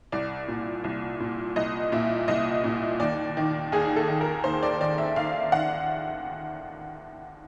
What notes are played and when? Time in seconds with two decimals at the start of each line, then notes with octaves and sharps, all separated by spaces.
0.12 C2 D5
0.48 A#2
0.84 C2
1.20 A#2
1.56 C2 D#5
1.92 A#2 E5
2.28 C2 D#5
2.64 A#2
3.00 D#2 D5
3.37 D#3
3.72 D#2 G#4
3.96 A4
4.08 D#3
4.21 A#4
4.44 D#2 C5
4.63 D5
4.80 D#3 D5
4.98 E5
5.16 D#2 F5
5.52 D#3 F#5